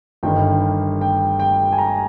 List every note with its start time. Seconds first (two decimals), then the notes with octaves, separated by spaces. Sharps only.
0.23 G1 G2 D#3 G5
1.01 G5
1.40 G5
1.73 G#5
1.78 A#5